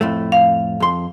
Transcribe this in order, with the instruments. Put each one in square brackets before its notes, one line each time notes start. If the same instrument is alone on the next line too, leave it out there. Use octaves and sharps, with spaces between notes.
[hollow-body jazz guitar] F2 A2 A3
[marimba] F5
[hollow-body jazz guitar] F2 C6